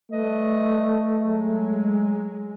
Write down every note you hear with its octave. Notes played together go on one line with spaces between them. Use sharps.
G3 A3 B4 D#5
F#3 G#3